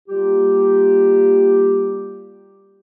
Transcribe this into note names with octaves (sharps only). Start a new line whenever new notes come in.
G3 A#3 F4 G4